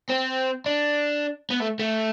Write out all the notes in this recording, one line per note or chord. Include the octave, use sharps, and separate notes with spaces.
C4
D4
B3
A3
A3